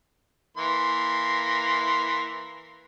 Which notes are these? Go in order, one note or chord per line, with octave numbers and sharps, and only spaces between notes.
E3 A#3 C6